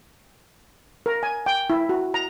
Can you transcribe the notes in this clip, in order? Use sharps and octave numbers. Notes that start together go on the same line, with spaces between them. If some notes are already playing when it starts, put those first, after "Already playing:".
A#4
G#5
G5
E4
F#4
A#5